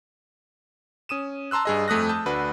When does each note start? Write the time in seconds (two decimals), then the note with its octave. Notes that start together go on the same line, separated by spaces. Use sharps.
1.09 C#4 D#6 D#7 E7
1.51 A5 A#5 C6 E6 F#6
1.65 G2 G#4 D#5
1.88 F2 A3 D#6 F#6 A#6
2.09 A5 D#6 G6
2.26 D2 D4 F#4 B4